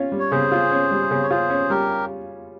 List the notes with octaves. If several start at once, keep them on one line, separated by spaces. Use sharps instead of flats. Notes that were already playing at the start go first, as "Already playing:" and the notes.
Already playing: C#4 F4
G3
C#5
C#3 G#4 C5
F4
C#4
G3
C#3
C#5
F4 G#4 C5
C#4
G3 G4 A#4